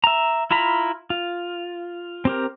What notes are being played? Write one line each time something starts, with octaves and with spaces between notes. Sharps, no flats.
E5 A#5
E4 F4 A#5 B5
F4
C4 G4 A#4